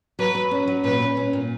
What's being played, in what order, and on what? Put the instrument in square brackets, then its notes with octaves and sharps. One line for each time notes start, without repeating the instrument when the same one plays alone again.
[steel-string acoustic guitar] F#3 [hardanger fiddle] B4
[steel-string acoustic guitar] F#3
C#4
F#3
[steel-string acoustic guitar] A#2 [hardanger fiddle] B4
[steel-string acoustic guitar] C#4
C#4
A#2